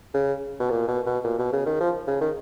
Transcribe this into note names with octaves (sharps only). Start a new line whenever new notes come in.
C#3
B2
A#2
B2
B2
A#2
B2
C#3
D#3
F3
C#3
D#3